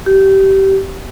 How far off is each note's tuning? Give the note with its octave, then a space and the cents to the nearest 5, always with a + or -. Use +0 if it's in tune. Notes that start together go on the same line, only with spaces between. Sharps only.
G4 -20